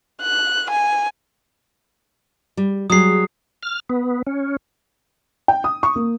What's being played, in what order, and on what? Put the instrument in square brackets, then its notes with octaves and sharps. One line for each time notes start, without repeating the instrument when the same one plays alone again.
[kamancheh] F#6
G#5
[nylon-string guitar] G3
[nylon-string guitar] F#3 G3 G#4 [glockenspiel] D#6 C7
[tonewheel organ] F6
B3
C#4
[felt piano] G5
D#6
C#6
A#3